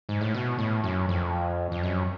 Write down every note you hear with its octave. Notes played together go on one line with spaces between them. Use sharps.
G#2
A2
B2
A2
F#2
F2
F2
F#2